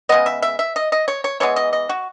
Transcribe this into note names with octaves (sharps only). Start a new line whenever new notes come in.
C#3 G#3 B3 D#5
E5
E5
E5
D#5
D#5
C#5
C#5
E3 G#3 B3 C#5
D#5
D#5
F#4